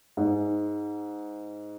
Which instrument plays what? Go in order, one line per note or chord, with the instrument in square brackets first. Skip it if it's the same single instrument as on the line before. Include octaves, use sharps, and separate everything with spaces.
[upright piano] G#2